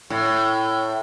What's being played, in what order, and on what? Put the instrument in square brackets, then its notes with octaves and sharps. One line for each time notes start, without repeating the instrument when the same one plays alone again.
[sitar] A2